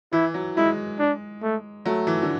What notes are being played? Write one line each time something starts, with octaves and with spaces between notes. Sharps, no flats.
E3 E4
F#3
G#3 E4
D4
A3
F#3 A3
E3
D3